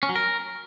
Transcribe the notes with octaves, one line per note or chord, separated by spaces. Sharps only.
C#4
F#3
A#4